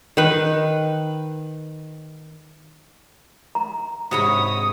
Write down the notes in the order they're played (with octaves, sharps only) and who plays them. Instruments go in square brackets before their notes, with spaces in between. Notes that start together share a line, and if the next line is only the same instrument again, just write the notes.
[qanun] D#3 B4
[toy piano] A#5
[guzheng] G#2 C3 [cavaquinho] F#4 C#5 B5 [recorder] D#6